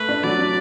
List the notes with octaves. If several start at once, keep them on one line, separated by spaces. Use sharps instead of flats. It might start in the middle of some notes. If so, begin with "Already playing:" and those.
Already playing: A3 B4
D4
F#3 D5
D4